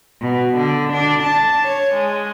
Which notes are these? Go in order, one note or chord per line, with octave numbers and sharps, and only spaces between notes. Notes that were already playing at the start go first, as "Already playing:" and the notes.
B2
D3
D4
A5
C#5
G#3